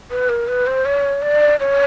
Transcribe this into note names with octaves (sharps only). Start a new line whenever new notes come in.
B4
A#4
B4
C5
C#5
D5
C#5